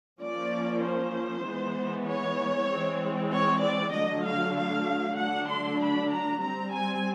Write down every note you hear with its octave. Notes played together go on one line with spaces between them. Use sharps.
F3 A#3 C#4 D5
C5
E3 G#3 B3
C#5
E3 G#3 C4
C#5
D5
D3 F#3 A3 D#5
F5
F5
D3 F#3 A3 D4 F#5
C6
B5
A#5
G3 C4 A#5
G#5